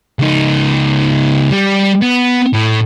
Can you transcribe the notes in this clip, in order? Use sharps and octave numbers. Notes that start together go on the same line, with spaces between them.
C#2 D#4
G3
B3
A2